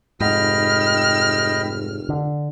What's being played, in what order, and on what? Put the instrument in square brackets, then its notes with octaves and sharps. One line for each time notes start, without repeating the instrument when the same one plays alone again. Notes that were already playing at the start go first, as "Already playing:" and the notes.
[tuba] F1 [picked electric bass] G#2 [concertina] D#5 G5 B5 [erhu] F6
[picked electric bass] D3